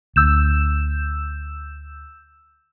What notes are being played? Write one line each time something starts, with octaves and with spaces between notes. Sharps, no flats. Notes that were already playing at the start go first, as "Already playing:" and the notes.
D2 E6 G6 E7